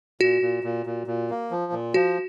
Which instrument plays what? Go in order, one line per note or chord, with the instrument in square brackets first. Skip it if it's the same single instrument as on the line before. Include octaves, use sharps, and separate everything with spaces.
[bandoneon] A#2 [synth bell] F#4
[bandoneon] A#2
A#2
A#2
A#2
A#3
F3
A#2
[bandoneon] F3 [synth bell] F#4